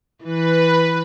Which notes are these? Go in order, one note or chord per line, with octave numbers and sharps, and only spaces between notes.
E3 B4